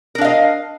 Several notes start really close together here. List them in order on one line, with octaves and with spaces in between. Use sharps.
A#4 D4 F5 D#5